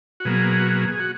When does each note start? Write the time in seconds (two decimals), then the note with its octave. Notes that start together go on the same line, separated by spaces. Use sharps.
0.20 F#4
0.25 B2 F#3 A#3 G#4
0.60 F#4
0.68 G#4
0.88 G#4
1.00 F#4